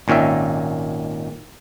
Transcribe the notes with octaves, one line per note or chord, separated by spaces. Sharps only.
G#1 A#2 D#3 C#4 E5